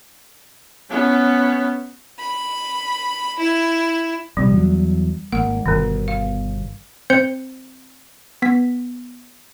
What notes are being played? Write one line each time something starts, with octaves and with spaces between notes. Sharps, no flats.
B3 C#4
B5
E4
A#1 C3 G3
E2 F#3
G#1 E2 A#3 F#5
G1 B2 D3 D#3
F5
C4 C5 G6 C#7
B3 B6